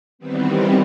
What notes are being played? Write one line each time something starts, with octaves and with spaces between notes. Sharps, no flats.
D#3 E3 G3 B3 C4